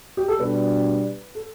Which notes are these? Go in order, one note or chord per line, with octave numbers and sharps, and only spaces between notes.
G4
A4
B2 G3 D4 B4
A4